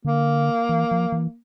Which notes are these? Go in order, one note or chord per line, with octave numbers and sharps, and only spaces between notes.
D3 A#3
E3
F3
E3